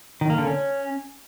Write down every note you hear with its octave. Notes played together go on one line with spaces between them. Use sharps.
D#3
A#3
D3
C#4